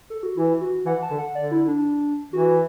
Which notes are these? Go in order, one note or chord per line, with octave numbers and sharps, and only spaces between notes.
A4
F#4
E3 E4
F#4
E3 F#5
A5
D3
F#5
D3 D5
E4
D4
E3 F#4